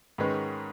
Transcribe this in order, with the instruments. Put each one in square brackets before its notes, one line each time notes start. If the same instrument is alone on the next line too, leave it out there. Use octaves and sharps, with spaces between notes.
[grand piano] G#2 D#3 G#3 C#4 B4